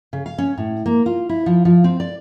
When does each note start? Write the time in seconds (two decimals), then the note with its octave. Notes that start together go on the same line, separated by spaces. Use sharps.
0.13 C#3
0.26 F5
0.38 C#4
0.58 A2
0.86 A#3
1.06 F4
1.29 E4
1.46 F3
1.65 F3
1.84 C4
2.00 D5